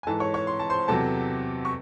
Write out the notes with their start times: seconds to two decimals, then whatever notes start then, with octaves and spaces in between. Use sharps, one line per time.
0.03 G#5
0.07 G#2 E3 A4 A5
0.20 C#5 C#6
0.34 C#5 C#6
0.47 C6
0.59 A5
0.70 C5 C6
0.88 E2 C3 F#3 A4 A5
1.65 C#6